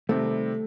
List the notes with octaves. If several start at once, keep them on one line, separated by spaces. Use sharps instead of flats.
C3 D#3 G3 A3 C4